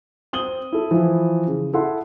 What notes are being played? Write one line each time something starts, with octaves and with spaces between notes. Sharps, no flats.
C4 D#6 F#7 G7
E4 A4
E3 F3 E4
C#3
E4 A4 F#5 C6